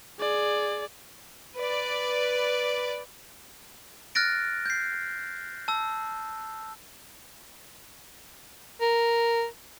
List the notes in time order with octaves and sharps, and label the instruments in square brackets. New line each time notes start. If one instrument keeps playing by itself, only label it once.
[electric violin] G#4 D5
[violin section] B4 D5
[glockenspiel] F6 F#6 A6 A#6 D7
G6 C7
A5 E6
[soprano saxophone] A#4